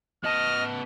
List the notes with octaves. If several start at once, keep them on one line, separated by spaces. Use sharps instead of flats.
B3 D#5 A5 F6